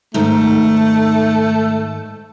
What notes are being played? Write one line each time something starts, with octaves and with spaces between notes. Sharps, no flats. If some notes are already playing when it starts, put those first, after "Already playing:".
G#2 D#3 A3